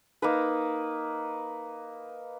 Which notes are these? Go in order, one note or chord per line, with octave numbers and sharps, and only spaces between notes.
A#3 D#4 B4